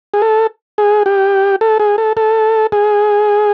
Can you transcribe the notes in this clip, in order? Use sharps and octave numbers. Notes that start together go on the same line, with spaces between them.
G#4
A4
G#4
G4
A4
G#4
A4
A4
G#4